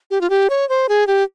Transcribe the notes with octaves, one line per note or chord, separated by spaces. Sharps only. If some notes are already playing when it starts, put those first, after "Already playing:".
G4
F4
G4
C#5
C5
G#4
G4